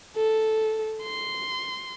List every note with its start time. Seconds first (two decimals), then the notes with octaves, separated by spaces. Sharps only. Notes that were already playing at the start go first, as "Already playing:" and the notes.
0.16 A4
1.03 C6